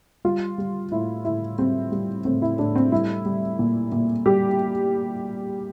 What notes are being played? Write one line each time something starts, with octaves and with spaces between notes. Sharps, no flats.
G3 F4
G3
A2 E4
A2 E4
G3 C4
G3
A2 C4
E4
A2 D4
C4
G3 E4
G3
A#2
A#2
G3 G4